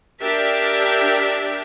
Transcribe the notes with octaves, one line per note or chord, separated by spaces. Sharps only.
D4 G4 A#4 E5